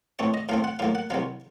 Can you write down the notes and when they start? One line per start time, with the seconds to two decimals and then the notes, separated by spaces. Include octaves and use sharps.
0.19 A2 A3 C4 C#5
0.34 D#5
0.49 A2 A3 C4 F5
0.64 F#5
0.79 A2 F#3 A#3 F5
0.95 F#5
1.10 C2 C3 F#3 F5